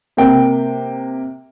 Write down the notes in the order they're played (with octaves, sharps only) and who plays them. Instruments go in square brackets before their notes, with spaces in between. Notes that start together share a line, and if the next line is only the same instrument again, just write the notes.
[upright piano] C3 A#3 G5